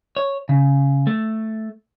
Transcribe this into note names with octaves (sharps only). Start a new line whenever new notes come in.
C#5
C#3
A3